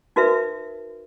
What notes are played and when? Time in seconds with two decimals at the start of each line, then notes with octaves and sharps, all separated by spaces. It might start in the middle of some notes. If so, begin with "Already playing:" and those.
0.16 D#4 F#4 A#4 B4 E5